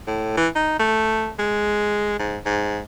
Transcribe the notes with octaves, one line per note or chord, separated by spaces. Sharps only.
A2
E3
D#4
A3
G#3
G#2
G#2